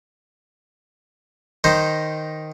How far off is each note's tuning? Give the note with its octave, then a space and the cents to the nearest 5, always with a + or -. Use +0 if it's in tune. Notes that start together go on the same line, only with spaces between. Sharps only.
D#3 +0 D#4 +0 C5 +0